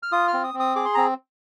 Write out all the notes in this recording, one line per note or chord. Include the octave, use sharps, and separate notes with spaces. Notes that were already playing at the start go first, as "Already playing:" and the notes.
F6
F4 D#6
F6
C4
D#6
C4
D#6
G#4 D6
C6
C4 A#5